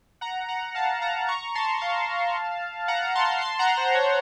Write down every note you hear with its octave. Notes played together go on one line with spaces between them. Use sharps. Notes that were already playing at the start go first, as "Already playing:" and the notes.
F#5 A#5
F#5 A#5
F5 A5
F#5 A#5
A#5 C#6
A5 C6
F5 A5
F#5 A#5
A5 C6
A5 C6
F#5 A#5
C5
C#5